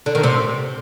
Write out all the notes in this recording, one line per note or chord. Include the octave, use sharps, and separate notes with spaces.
D3
D#3
C3